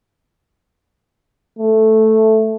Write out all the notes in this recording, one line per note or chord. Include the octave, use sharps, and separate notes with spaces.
A3